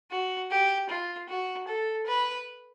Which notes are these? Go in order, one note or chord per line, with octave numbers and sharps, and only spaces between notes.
F#4
G4
F4
F#4
A4
B4